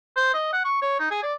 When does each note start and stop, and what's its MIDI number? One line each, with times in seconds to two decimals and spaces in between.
0.16 0.33 72
0.34 0.50 75
0.53 0.64 78
0.65 0.78 85
0.82 0.99 73
0.99 1.08 63
1.11 1.23 68
1.23 1.33 74